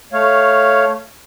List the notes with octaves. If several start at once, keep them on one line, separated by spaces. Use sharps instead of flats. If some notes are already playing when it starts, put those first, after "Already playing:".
A3 C#5 F5